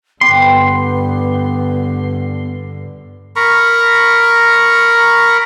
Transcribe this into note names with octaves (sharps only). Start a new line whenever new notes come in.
G2 D3 B3 G4 B4 C6
A#4 A#5 B5 C#6